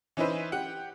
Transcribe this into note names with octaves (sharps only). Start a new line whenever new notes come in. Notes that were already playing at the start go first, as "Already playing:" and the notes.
E3 C#4 D#4 E4 B4 C5
G4 F#5